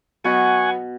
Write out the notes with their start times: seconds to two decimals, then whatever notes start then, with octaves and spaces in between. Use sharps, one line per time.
0.24 B2 F#3 B3 F#5 G#5 C#6